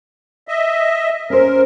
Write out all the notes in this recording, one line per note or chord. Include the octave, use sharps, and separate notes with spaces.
D#5 E5
C#4 A#4 C5